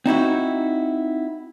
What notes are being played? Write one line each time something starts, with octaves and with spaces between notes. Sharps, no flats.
C4 D#4 E4 F#4